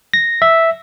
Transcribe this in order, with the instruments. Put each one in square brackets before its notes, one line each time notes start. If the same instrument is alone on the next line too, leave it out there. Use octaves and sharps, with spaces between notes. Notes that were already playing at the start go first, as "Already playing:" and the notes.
[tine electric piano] A#6
E5